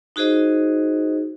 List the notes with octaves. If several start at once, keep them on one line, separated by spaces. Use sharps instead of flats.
D#4 F#4 G#4 C5 D#5